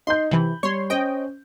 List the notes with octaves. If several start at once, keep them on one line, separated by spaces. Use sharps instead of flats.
D#4 C6 G6
C3 E3 B5 F#7
G3 C#5 C6
C#4 C5 D#5 G5